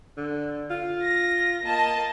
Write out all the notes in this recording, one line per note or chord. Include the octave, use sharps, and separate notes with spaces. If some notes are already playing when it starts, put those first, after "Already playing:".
D3
F4
A#6
A#3 D#5 A5